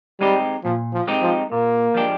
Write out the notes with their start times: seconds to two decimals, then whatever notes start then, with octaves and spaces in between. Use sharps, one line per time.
0.20 G3 G#3 C4 D#4 G4
0.64 A#2 F3
0.93 F3
1.07 G#3 C4 D#4 G4
1.22 F3
1.51 A#2 A#3
1.94 F3 G#3 D4 G4